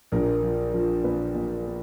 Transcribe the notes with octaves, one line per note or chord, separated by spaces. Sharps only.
A#1 A#4
F3
F3
A#2 B4
A#2
A#3